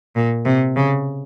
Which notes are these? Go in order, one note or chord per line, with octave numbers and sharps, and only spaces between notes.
A#2
C3
C#3